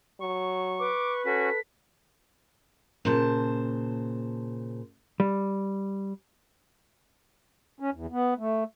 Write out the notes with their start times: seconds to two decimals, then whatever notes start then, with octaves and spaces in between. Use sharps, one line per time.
0.21 F#3 C#6
0.79 B4 D6
1.26 C#4 F#4 A4 B6
3.05 A#2 C#3 C5 A5
5.20 G3
7.80 C#4
7.93 E2
8.12 B3
8.38 A3